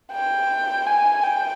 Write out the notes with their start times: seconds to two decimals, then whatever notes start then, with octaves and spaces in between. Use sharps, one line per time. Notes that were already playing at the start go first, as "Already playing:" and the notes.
0.12 G5
0.86 G#5
1.23 G5